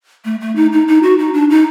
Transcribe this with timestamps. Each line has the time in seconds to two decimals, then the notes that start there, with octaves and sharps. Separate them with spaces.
0.25 A3
0.41 A3
0.56 D#4
0.72 D#4
0.88 D#4
1.03 F#4
1.19 D#4
1.34 D4
1.50 D#4